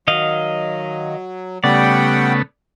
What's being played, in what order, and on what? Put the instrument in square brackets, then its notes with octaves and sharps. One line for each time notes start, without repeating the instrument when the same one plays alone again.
[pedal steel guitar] D#3 D#5 F5 [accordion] F#3
[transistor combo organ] C#3 A3 B3 [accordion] G3 F#5 G5 [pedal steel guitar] D5